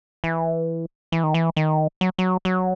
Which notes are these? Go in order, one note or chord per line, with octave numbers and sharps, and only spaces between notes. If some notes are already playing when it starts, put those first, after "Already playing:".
E3
E3
D#3
E3
D#3
F#3
F#3
F#3